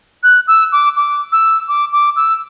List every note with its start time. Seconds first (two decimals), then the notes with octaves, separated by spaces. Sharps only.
0.23 F#6
0.47 E6
0.72 D6
0.96 D6
1.32 E6
1.68 D6
1.93 D6
2.16 E6